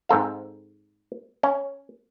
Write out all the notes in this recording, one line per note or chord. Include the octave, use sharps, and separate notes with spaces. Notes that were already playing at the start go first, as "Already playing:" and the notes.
G#2 C4 A4 F5
C#4